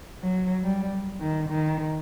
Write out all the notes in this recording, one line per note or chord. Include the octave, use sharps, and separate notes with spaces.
F#3
G3
D#3
D#3